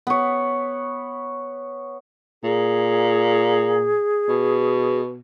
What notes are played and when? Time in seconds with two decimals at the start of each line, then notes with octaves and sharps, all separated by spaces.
0.07 B3 C#5
2.44 A#2 G#4
4.28 B2